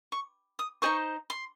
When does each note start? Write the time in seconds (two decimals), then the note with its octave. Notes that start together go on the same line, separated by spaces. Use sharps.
0.12 C#6
0.59 D#6
0.82 D#4 G#4 C5 D#5 C#6
1.30 C6